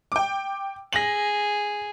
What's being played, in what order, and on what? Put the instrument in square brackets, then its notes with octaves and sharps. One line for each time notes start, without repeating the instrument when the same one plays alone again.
[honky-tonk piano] G5 D6
[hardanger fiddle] G#4 [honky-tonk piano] A#6 F#7